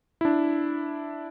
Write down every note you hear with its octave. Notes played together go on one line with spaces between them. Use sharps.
D4 E4